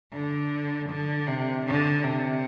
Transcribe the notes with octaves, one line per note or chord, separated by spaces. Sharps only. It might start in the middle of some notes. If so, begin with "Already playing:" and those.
D3
D3
C3
D3
C3